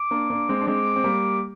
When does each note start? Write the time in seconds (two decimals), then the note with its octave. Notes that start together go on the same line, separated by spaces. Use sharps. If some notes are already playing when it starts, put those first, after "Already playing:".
Already playing: D6
0.11 A#3 D4
0.30 A#3 D4
0.49 G#3 C4
0.61 D4
0.67 G#3 C4 D6
0.96 C4
1.04 G3 A#3